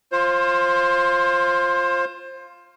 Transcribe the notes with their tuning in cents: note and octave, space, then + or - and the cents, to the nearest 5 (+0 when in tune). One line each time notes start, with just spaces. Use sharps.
F4 +0 C5 +25